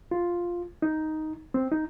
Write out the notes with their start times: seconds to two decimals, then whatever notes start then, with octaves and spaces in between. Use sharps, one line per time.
0.11 F4
0.82 D#4
1.54 C4
1.72 D#4